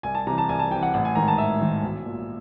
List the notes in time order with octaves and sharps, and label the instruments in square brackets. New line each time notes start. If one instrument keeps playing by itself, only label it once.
[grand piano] C2 G#5
A5
C3 A#5
E3
A5
C2 G#5
A5
C3 G5
E3
F#5
A1 F#5
G#5
G#2 D#3 A#5
A5
A1 E5
G#2 D#3
B1
A#2